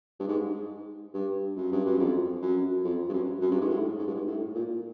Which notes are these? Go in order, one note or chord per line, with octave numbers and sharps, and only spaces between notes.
G2
G#2
G2
F#2
G2
F#2
F2
F#2
F2
G2
F#2
F#2
G2
G#2
A2
G#2
G2
G#2
A2
A#2